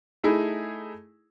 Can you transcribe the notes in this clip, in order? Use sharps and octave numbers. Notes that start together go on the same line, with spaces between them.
A3 D#4 E4 G#4